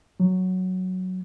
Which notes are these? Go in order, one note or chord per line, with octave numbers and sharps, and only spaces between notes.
F#3